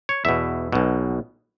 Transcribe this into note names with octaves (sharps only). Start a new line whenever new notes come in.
C#5
E2 B2 E5
B1 B2